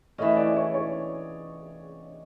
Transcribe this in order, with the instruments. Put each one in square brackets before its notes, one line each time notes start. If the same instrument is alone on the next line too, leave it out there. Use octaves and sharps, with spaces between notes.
[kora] E3 A3 C#4 [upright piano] D#5
[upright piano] D5
C#5
C#5